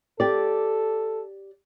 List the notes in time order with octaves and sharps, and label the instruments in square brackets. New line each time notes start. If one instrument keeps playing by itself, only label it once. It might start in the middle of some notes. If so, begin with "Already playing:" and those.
[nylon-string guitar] G4 D5 [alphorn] A4